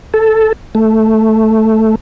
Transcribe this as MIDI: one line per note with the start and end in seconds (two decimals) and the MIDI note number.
0.14 0.53 69
0.75 1.95 57